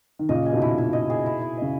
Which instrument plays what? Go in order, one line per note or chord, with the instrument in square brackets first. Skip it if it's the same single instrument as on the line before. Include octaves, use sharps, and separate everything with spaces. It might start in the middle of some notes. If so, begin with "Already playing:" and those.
[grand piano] D#3
[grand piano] A#2 C#3 [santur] D#5
[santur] G#4
[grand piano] B2 D#3
[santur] E4
E4
D#5
G#4
E4
E4
[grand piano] C#3 [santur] D#5